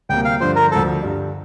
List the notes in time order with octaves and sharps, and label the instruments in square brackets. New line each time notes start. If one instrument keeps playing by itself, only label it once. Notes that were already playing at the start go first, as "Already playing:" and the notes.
[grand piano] D2 C3 G3 A#3 [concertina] G5
[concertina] F5
[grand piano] G2 D3 F3 [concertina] C5
[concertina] A#4
[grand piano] D2 D3 F3 C4 [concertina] A4
[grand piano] G2 D3 G3